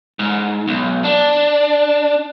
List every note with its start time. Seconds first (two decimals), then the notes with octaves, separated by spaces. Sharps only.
0.19 G#2
0.68 B1
1.04 D4